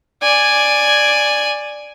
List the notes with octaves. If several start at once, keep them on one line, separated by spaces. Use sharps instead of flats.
D5 G#5